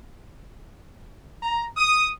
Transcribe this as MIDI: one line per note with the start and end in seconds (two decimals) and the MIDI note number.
1.42 1.66 82
1.77 2.12 87